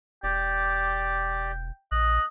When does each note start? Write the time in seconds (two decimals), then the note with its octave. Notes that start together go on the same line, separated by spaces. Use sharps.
0.23 E1 G4 D5 G5
1.92 A#1 D#5 F#6